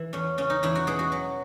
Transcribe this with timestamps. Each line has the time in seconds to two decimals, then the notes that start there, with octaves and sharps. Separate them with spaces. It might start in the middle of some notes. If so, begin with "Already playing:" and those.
Already playing: E3 E4
0.13 E2 C#4
0.38 C#3 C#4
0.50 D#4
0.63 E2 E4
0.75 F#4
0.87 B2 G#4
0.99 F#4
1.12 F#3